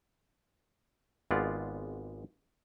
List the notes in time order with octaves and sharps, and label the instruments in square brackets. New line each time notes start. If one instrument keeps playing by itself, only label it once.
[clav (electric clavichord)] G#1 G#3 B3 F4 D5